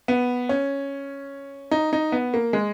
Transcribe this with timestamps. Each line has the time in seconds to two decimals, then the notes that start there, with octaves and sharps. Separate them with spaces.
0.08 B3
0.49 C#4
1.71 D#4
1.93 D#4
2.12 B3
2.34 A#3
2.53 G#3